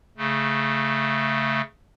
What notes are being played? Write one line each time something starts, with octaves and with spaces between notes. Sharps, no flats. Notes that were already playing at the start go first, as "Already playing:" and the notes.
C#3 A3